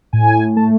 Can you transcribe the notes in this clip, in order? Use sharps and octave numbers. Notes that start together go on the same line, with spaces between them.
A2 G#5
A3 A5